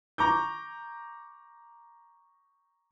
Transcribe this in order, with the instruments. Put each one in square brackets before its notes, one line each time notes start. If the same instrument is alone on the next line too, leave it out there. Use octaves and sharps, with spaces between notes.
[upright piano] A#5 C#6 D6 G6